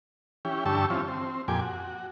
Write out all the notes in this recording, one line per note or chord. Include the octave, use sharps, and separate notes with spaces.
E3 C#4 G4
G2 D3 G4 A5 C#6 E6
E3 C4 C#4 F4
C4
F2 A#2 G4 G#5 D6
F#4